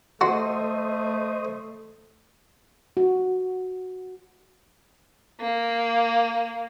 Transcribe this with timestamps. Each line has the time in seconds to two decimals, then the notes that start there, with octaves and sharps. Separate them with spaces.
0.21 A3 F#4 C5 D#5 C6
2.97 F#4
5.40 A#3